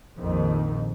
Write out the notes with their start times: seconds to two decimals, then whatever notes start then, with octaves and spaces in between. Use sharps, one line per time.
0.17 A#1 F2 D#3